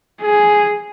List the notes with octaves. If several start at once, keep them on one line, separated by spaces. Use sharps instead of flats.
G#4